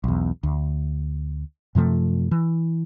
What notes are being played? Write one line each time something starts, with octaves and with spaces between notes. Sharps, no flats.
B1 E2
D2
F#2 C3 F3 A3
E3